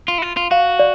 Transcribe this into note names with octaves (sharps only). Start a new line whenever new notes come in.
F4
E4
F4
F4
F#4 F5
D5